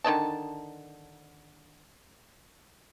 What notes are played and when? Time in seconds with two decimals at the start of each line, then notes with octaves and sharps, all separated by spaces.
0.04 D3 D#3 D#5 A5